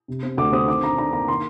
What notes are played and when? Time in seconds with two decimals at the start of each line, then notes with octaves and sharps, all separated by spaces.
0.08 C3
0.23 C4
0.37 D2 D6
0.52 C4 D#6
0.68 D#3 D6
0.83 D4 A#5
0.98 D4 A#5
1.13 A#3 A#5
1.28 D#3 C6